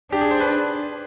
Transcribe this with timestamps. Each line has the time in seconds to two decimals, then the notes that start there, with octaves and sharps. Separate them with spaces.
0.12 D4 G4
0.21 G#4
0.31 C5
0.40 B4